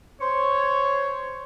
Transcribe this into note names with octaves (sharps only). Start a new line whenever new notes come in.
C5 C#5